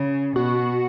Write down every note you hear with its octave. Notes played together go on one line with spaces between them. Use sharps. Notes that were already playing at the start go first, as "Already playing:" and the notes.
Already playing: C#3
B2 F#4